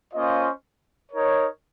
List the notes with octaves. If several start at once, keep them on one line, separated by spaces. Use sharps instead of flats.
A#3 C#4 F4 C5 D#5
D#4 A#4 C#5